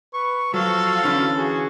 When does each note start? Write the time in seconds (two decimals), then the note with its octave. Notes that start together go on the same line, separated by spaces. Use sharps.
0.14 B4 C#6
0.54 F3 F#3 F#4 A4 F5
1.04 D3 E3 C#4
1.37 F#4 G#4